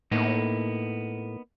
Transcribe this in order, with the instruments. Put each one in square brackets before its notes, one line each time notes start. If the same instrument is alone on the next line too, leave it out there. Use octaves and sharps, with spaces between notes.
[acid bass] A2 [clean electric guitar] A#3 B3 D#4